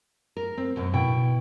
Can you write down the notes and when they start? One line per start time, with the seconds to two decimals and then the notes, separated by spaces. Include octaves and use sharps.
0.37 A#4
0.57 C4
0.76 F#2 B2
0.93 B2 E4 G5